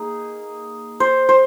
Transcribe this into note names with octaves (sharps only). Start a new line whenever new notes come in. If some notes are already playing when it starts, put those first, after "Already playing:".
Already playing: A#3 D#4 G#4
C5
C5